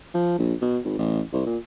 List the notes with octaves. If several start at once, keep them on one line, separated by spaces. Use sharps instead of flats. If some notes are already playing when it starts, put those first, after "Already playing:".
F3
A#1
B2
G#1
A1
C2
A#2